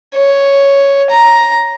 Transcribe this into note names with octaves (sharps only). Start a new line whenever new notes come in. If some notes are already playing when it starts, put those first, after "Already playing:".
C#5
A#5